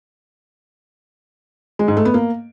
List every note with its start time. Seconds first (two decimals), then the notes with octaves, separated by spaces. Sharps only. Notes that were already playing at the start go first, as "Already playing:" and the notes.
1.79 G#3
1.88 G#2
1.97 A3
2.05 B3
2.14 A#3